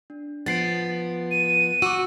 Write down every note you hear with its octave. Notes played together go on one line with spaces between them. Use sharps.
D4
F3 B3 A6 C7 D7
D#7
F#4 D6 E6